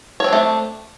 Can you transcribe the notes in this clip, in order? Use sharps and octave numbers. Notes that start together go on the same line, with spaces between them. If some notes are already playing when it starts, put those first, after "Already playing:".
A3 C4 D4 C#5